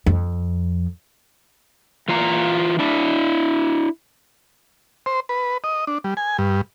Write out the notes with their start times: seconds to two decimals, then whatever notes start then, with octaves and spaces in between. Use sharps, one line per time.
0.06 F2
2.08 E3 F4 F5 A#5
2.79 D4 E4
5.06 C5
5.29 B4
5.64 D#5
5.87 D4
6.04 G3
6.17 G#5
6.38 G2